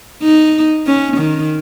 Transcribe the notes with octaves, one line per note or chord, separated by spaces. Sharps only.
D#4
C#4
D#3